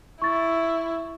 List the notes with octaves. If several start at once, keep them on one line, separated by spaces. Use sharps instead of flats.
E4 C#6 A6